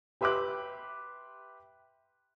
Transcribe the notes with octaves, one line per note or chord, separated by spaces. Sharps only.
G4 B4 E5 C6 D6 F#6